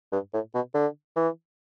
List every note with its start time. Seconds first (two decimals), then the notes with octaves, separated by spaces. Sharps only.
0.12 G2
0.33 A2
0.54 B2
0.74 D3
1.16 E3